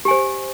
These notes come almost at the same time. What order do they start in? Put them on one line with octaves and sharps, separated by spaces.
G4 G#5 C5